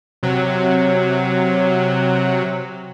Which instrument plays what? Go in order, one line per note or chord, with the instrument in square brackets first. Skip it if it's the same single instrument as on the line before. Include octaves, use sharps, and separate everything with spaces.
[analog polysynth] C3 F#3